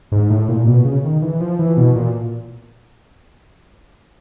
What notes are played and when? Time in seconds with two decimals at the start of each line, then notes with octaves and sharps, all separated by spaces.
0.12 G#2
0.30 A2
0.49 A#2
0.67 B2
0.85 C#3
1.04 D#3
1.22 E3
1.40 F3
1.59 E3
1.77 B2
1.96 A#2